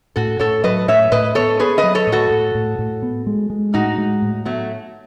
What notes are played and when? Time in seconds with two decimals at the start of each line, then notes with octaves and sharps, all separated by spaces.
0.16 A2 F#4 A4
0.39 A2 A4 C#5
0.64 F#3 B4 D#5
0.88 A2 C#5 E5
1.12 A2 B4 D#5
1.35 B3 A4 C#5
1.59 B3 G#4 B4
1.78 B4 D#5
1.83 F#3
1.95 A4 C#5
2.07 A2
2.12 F#4 A4
2.30 A2
2.55 A2
2.79 A2
3.02 B3
3.27 G#3
3.50 G#3
3.74 A2 D#4 F#4
3.98 G#3
4.22 A2
4.45 F#3 A3 B3